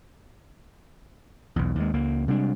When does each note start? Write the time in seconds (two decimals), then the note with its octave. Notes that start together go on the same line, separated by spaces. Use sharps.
1.56 B1 E2
1.75 D#2 G#3
1.93 C#2 A#3
2.28 C3 G3 G#3 D4